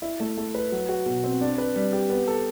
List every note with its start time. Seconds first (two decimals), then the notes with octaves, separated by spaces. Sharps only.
0.02 E4
0.20 A3
0.37 A3
0.55 B4
0.72 F#3
0.89 F#4
1.06 B2
1.24 C4
1.41 D4
1.58 B4
1.75 G3
1.92 G4
2.10 B3
2.28 A4